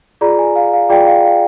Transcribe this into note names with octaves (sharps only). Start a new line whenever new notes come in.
F4 G#4 D5 A#5
G#5
F5
F5
F4 G#4 D5 G5
F5
F5